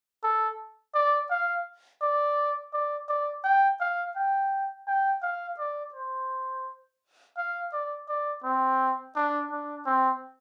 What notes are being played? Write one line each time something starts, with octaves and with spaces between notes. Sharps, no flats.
A4
D5
F5
D5
D5
D5
G5
F5
G5
G5
F5
D5
C5
F5
D5
D5
C4
D4
D4
C4